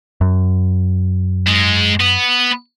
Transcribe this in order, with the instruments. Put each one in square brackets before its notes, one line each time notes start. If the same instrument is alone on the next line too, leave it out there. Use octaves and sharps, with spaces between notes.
[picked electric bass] F#2
[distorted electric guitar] G#2 G#3
B3